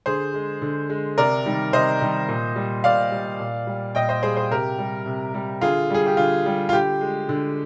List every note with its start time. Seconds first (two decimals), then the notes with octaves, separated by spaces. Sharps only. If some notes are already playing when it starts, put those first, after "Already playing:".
0.06 D3 G#4 C5
0.34 G#3
0.62 D3
0.90 G#3
1.17 C3 A#4 D5
1.46 D#3 G3
1.72 C3 C5 D#5
2.01 D#3 G3
2.28 A#2
2.56 G3
2.84 A#2 D5 F5
3.12 G3
3.39 A#2
3.67 G3
3.95 A#2 D#5 G5
4.09 C5 D#5
4.23 G3 G#4 C5
4.37 G#4 C5
4.50 C3 G4 A#4
4.78 G3
5.06 C3
5.34 G3
5.61 D3 F4 G#4
5.90 G3 G#4
6.06 G4
6.17 D3 F4
6.46 G3
6.69 F4
6.73 D3 G4
7.01 G#3
7.29 D3